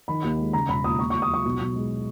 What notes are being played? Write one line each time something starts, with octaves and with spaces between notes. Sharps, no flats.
D#3 B5
D#2
G#3
C#3 A#5
E1 B5
D#2 D#6
D#2 C#6
C#6
D#2
D#6
F#3 C#6
B1
B1
G#3